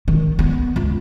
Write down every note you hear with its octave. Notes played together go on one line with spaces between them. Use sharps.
D#3
B3
C#2